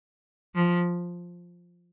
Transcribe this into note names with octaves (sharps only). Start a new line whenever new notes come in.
F3